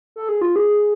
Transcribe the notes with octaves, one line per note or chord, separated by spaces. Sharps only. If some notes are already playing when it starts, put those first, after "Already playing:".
A4
G#4
F4
G#4